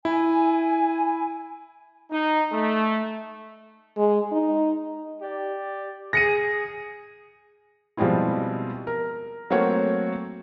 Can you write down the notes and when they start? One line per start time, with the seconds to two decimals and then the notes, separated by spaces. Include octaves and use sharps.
0.05 E4 G#5
2.10 D#4
2.52 A3
3.97 G#3
4.32 D#4
5.20 G4 D5
6.13 G#4 A#6 C#7 D#7
7.97 B2 F3 G3 G#3 C4 E4
8.87 A#4
9.50 F#3 A3 A#3 C4 C#5 F#5